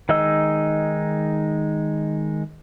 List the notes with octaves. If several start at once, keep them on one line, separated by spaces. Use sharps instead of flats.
D#3 G#3 D#4 D#5 E6